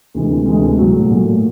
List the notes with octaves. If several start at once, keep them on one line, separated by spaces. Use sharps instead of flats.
D2 C3 E3 G#3
D2 C3 E3 G#3
A#2 F#3 A3
A#2 F#3 A3